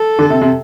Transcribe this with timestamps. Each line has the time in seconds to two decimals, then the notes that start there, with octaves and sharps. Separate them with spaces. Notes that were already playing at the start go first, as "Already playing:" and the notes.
Already playing: A4
0.19 D3
0.30 C3
0.42 C3